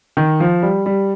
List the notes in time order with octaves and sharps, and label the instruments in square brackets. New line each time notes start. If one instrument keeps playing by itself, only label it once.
[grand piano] D#3
F3
G3
G3